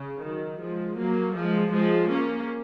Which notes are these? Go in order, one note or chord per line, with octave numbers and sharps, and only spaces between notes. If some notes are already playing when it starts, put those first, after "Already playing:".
Already playing: C#3
D#3 F#3
F3 G#3
F#3 A#3
F3 G#3
F3 G#3
A#3 C#4